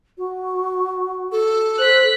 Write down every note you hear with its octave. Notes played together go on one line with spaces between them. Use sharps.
F#4
A4
C5 F#6 B6